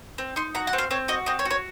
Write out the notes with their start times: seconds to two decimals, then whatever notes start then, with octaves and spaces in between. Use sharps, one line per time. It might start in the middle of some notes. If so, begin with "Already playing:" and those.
0.18 C4
0.36 D#4 C6
0.55 F#4 A#5
0.67 F#5
0.73 C4
0.78 F5
0.91 C4 C#5
1.08 F#4 D#5
1.26 C4 D#5
1.39 C#5
1.45 F#4
1.50 C#5